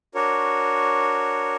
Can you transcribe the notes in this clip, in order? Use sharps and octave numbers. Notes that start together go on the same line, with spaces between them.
D4 F#4 A#4 C#5